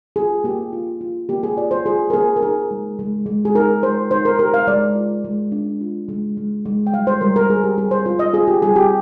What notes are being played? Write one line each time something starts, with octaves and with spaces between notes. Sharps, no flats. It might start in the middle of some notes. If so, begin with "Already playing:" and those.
F4 G#4
A#3 G4
F4
F4
A#3 G4
G#4
F4 D5
C5
F4 G#4
A#4
A#3 G#4
A#4
D#4 G#4
G#3
G#3
G#3
G#4
D#4 A#4
G#3 C5
D#4 C5
A#4
G4 A#4
F5
G#3 D5
F4
G#3
D4
F4
G#3
G#3
G#3
G5
G3 F5
C5
G3 A#4
A#4
G3 G#4
G4
G3 G#4
C5
F4 C5
D#5
F4 G#4
G4
G3 G#4
G4